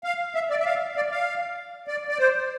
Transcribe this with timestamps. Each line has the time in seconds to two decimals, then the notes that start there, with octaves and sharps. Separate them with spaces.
0.04 F5
0.35 E5
0.50 D5
0.60 E5
0.65 F5
0.96 D5
1.11 F5
1.87 D5
2.09 D5
2.18 C5